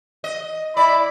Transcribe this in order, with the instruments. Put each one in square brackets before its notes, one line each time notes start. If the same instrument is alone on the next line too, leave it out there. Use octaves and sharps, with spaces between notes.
[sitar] D#5
[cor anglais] E4 [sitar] D5 [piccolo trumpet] B5